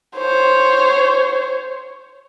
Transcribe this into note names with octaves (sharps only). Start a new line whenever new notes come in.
C5 C#5